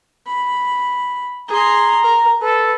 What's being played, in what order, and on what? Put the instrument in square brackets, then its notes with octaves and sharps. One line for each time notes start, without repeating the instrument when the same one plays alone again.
[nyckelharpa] B5
[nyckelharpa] G#4 C6 [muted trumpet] A#5
[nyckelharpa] A#4
[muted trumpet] A4 [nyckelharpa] B4